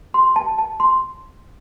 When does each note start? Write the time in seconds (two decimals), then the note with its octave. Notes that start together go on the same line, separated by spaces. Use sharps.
0.14 C6
0.36 A5
0.59 A5
0.80 C6